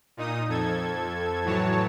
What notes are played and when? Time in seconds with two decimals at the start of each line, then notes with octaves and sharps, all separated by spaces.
0.17 A#2 D#4 D#6
0.48 F2 A4 G#6
1.44 A2 E3 F#3 C#5 A5